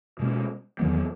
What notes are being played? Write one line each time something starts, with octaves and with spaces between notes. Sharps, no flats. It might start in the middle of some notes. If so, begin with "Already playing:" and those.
B2 G#3 C#4
E2 D#3 F#3 B3